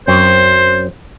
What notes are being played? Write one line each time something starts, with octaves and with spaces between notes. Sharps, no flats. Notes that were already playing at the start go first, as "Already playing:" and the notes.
F#2 C4 C5